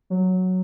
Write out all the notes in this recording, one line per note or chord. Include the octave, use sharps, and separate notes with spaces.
F#3